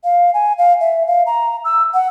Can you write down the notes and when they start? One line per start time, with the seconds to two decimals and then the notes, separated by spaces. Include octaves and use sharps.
0.04 F5
0.34 G#5
0.58 F5
0.80 E5
1.07 F5
1.26 A#5
1.65 E6
1.94 F#5